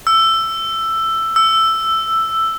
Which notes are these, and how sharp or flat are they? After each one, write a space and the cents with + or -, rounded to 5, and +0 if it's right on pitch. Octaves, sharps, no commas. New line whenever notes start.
E6 +10
E6 +5